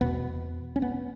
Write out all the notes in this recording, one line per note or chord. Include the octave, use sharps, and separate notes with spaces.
E2 B2 B3
C#4
B3